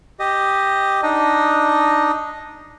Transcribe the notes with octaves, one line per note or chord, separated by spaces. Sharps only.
G4 D#5
D4 D#4 D#5